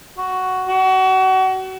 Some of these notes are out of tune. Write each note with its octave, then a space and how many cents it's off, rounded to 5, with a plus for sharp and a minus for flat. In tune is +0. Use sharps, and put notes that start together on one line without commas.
F#4 +5
F#4 +30